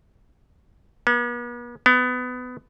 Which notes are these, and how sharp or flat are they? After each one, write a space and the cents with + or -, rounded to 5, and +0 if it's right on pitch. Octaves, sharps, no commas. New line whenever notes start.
B3 -45
B3 +20